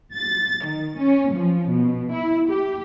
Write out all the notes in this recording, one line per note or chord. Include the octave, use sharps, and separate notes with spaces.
A6
D#3
C#4
F3
B2
E4
G4